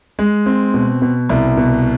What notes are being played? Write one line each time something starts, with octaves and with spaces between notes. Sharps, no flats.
G#3
C4
B2
B2
C2
B2